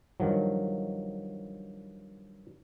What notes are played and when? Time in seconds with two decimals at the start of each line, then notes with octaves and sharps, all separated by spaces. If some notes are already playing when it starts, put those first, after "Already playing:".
0.20 G2 D#3 F3 F#3